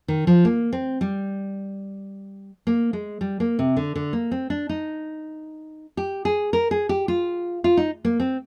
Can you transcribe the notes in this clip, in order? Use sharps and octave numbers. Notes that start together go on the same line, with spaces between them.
D#3
F3
A#3
C4
G3
A#3
G#3
G3
A#3
C3
D3
D3
A#3
C4
D4
D#4
G4
G#4
A#4
G#4
G4
F4
F4
D#4
A#3
C4